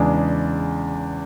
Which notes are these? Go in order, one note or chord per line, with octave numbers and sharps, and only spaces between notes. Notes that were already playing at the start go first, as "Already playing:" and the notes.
Already playing: E2 C#3 G#3 D4